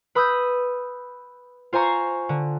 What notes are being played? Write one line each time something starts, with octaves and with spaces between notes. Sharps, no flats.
B4 B5 D#6 E6 G6
F4 C5 G#5 A#5 C#6
D3